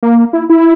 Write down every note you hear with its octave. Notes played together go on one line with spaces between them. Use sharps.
A#3
E4
E4